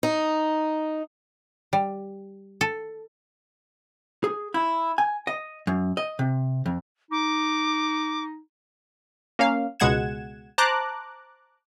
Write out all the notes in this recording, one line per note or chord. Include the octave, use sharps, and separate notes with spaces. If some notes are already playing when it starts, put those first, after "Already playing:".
D#4
G3
A4
G#4
E4
G#5
D#5
F#2
D#5
C3
F2
D#4 D6
A#3 C#4 F5
C#2 B2 G#3 F#5 G#6 E7
C5 A5 A#5 D6 F#6